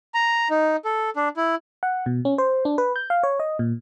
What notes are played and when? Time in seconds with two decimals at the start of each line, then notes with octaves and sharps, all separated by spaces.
0.14 A#5
0.50 D#4
0.85 A4
1.16 D4
1.37 E4
1.83 F#5
2.06 B2
2.25 C#4
2.38 C5
2.65 D4
2.78 B4
2.96 G6
3.10 F5
3.23 C#5
3.40 D#5
3.59 A#2